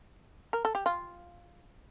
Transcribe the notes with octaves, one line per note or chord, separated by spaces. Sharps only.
A#4
A4
G4
F4